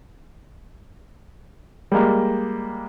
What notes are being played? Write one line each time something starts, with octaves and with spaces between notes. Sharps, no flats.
G3 G#3 A#3 A#4